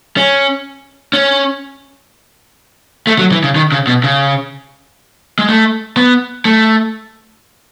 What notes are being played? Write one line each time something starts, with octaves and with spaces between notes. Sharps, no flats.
C#4
C#4
A3
F#3
E3
C#3
D#3
C#3
B2
C#3
G#3
A3
B3
A3